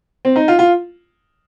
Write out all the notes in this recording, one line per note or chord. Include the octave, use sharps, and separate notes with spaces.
C4
D#4
F4
F4